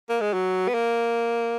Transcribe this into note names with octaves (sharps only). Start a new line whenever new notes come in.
A#3
G#3
F#3
B3
A#3